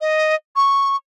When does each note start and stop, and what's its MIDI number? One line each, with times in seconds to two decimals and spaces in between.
0.01 0.35 75
0.56 0.96 85